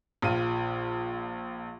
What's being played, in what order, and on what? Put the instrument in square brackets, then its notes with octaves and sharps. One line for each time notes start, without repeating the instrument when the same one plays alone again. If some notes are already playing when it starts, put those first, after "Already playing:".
[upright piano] A#1 F4 D#7